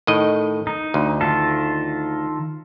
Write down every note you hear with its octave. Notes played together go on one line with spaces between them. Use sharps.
A2 D#3 D#5
D#4
D2
D#3 F4 A4